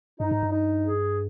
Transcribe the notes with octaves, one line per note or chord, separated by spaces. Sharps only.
G2 D#4
G#2
G2
D#4
G#4